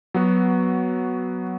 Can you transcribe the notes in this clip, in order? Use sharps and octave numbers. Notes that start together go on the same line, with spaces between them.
F#3 B3 F#4